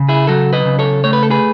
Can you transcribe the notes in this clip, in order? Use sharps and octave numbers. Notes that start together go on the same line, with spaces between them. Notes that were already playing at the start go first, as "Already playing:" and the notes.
Already playing: C#3
E4 G#4
F#3 F#4 A4
B4 D#5
C#3
A4 C#5
A3 C#5
B4
A4
G#4 B4